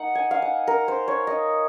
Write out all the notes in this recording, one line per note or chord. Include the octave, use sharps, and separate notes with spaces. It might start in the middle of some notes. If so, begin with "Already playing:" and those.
Already playing: A#3 D#4 F#5
G#5
F5
F#5
A#4
C5
C#5
D#5